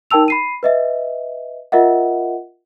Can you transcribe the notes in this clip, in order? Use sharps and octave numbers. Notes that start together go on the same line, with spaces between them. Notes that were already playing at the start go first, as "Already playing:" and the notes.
D#4 A#4 G5 A5 E6 F7
B5 C7 D#7
B4 D#5 E5
F4 A#4 D#5 E5 F#5